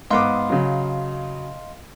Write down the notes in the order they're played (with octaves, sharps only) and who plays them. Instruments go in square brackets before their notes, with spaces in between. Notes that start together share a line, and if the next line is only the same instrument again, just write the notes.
[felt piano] G#2 B3 D6 [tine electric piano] D#5 F5 C6
[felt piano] C#3 F#3